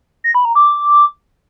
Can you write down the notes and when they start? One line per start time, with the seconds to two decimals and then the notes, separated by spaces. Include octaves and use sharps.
0.24 A#6
0.35 B5
0.45 A#5
0.55 D6